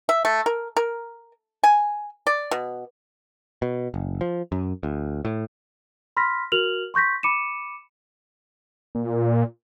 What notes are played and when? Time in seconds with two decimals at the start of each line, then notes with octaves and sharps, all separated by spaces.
0.09 E5
0.25 A3
0.46 A#4
0.77 A#4
1.63 G#5
2.27 D5
2.51 B2
3.62 B2
3.94 F#1
4.21 F3
4.52 F#2
4.83 D2
5.25 A2
6.17 B5 C6 F6 A#6 B6
6.52 F#4 A#4 F6 F7 F#7
6.94 C6 C#6 G6 A#6 B6
7.23 B5 D6 C#7 D#7 E7
8.95 A#2